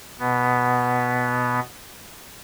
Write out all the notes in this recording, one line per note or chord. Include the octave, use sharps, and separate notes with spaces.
B2 B3